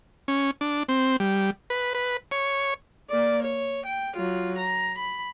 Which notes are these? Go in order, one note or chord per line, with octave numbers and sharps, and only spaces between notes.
C#4
D4
C4
G3
B4
B4
C#5
A#3 D5
C#5
G5
F#3 F4
A#5
B5